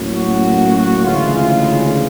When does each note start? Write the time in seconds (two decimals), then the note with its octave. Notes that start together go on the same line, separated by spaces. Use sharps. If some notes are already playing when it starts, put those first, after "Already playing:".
Already playing: A2 F#3 A#3 C#4
0.14 F#4
0.75 F#4
1.04 D2 C#3 E3 G#3 F4
1.34 F4